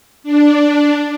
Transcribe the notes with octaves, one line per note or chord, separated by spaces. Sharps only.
D4